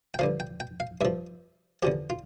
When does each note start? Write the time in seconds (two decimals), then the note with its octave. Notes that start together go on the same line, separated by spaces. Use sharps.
0.14 G5
0.19 G2 D3 F3 F5
0.40 G5
0.60 G5
0.80 F5
1.01 G2 F3 E5
1.83 E2 D3 F3 G4
2.10 F4